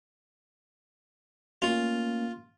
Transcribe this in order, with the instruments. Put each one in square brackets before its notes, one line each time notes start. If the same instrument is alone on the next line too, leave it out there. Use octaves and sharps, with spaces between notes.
[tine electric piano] A3 A#3 C#4 [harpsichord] F4